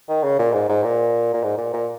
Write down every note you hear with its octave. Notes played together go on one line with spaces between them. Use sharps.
D#3
C#3
A#2
G#2
G#2
A#2
A#2
G#2
A#2
A#2